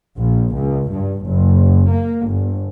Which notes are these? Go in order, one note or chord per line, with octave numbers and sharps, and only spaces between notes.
A#1
C#2
G2
F#1
A#3
G1